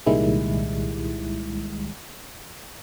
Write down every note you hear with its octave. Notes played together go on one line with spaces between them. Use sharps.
C2 A#2 D#3 G3 G#3 E4